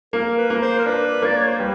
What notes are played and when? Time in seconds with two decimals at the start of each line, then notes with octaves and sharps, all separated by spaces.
0.13 A#3 A#4
0.38 B4
0.50 A#3
0.62 C5
0.79 A#4
0.86 D4 B4
1.22 A#3 D5
1.37 C#5
1.48 C5
1.60 G3 B4